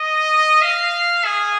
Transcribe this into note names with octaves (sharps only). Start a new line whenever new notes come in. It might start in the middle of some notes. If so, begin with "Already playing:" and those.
Already playing: D#5
F5
G#4